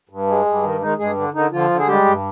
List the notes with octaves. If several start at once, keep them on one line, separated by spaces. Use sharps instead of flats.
G2
G#3
G2
D#3
D#3 G#3 D#4
G2 G#3 G#4
D3 D4
D3 D#3 D#4
D3 F3 F4
D3
G#4
G3 G#3 G4
G2